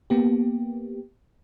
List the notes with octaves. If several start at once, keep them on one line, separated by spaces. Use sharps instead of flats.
A#3 B3 G4